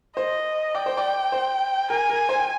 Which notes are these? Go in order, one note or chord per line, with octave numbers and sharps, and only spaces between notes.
C5 D#5
D5 G5
C5
D5
C5
A#4 G#5
A#4
C5
G5